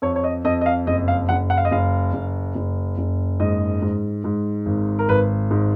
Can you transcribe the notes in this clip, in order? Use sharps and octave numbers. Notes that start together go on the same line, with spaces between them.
F2 C#5
C#5
D#5
F2 D#5
D#5
F5
F#1 D#5
F5
F#1 F#5
F#5
F5
D#5
F#1 F5
F#1
F#1
F#1
G#2 D#5
G#2
G#2
G#1
A#4
G#1 B4
G#2